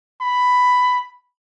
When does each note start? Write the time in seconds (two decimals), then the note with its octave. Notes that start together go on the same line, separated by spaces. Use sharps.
0.21 B5